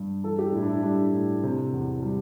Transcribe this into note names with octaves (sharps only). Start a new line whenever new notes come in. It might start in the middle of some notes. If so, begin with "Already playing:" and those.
Already playing: G2
E3 A4
G4
D4
A2 E4
D4
E4
G3 D4
A2
C3
E2
G3